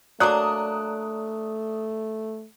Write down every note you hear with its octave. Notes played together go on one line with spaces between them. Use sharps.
F#3 A3 A#3 D4 D5 D#6 F#6